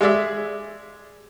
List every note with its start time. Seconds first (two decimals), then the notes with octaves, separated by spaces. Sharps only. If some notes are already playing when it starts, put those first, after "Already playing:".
0.01 G#3 G#4 D5 E5